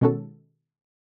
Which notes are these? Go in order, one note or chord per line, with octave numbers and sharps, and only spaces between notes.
B2 D#3 G#3 C#4 F#4 A4